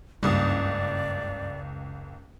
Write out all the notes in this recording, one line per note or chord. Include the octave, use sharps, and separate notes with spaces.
F#1 C#2 G2 D5 D#6